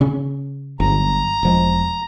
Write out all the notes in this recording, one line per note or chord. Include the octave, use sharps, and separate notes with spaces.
C#3 C#4
G1 F#3 A#5
E1 F3 G#3